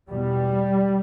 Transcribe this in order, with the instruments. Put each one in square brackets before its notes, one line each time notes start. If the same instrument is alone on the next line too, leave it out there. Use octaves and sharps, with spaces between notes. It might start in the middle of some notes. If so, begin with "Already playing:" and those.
[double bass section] E2 B2 G3